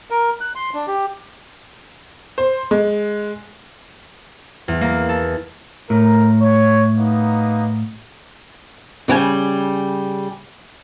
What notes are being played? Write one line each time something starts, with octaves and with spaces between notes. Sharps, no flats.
A#4
F#6
C6
D4
G4
C5
G#3
E2
A#3
A4
A2 A#4
C#5
A#3 B3 D#4
C#3 G3 F#5 G#5